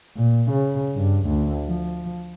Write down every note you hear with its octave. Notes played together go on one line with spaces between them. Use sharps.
A#2
C#3
G2
D2
F3